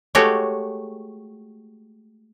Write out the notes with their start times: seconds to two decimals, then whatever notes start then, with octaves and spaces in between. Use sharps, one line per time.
0.15 G#3 A3 F#4 G4 C#5